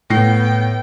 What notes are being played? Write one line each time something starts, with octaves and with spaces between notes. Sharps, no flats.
A2 B3 G5 A#6 C7